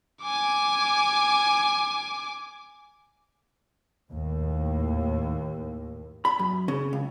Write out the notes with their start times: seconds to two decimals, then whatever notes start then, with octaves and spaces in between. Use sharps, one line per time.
0.22 G#5 D6
4.10 D#2 A2
6.25 B5
6.39 F#2
6.68 C#3
6.93 C#2